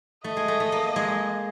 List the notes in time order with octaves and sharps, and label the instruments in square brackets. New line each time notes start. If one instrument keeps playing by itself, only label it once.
[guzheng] A3 [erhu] D#5
[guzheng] G#3
A3
A3
A#3
G#3